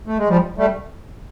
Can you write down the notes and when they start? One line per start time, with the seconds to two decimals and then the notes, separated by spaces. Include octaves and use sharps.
0.07 A3
0.18 G#3
0.29 F3 G3
0.58 G3 A3